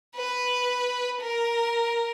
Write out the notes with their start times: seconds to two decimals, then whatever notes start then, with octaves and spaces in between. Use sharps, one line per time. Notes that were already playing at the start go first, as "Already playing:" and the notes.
0.16 B4
1.21 A#4